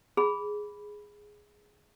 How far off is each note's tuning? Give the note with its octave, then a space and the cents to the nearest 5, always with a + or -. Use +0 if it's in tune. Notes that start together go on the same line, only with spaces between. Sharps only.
G#4 +0 B5 +0